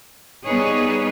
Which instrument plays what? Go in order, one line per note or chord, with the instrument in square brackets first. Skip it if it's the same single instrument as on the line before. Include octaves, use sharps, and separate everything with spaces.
[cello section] G3 B3 D#4 G#4 B4 C#5